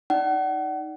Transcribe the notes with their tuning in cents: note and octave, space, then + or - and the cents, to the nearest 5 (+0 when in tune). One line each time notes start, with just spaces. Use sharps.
D#4 +0 D5 -10 F#5 +35